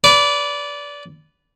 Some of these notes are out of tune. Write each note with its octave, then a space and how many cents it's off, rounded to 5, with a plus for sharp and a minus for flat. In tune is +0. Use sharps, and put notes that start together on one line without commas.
B4 +0 D5 -20